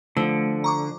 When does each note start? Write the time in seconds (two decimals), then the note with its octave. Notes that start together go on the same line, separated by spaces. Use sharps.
0.17 D3 F3 A3
0.64 A#5 C#6 D6